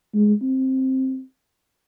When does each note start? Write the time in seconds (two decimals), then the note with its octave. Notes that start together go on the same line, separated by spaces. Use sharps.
0.14 G#3
0.42 C4